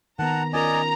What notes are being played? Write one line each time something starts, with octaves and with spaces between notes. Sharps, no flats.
D#3 B3 F#5 A5 A#5
C#4 F4 A#4 D5 D#5 G#5 A#5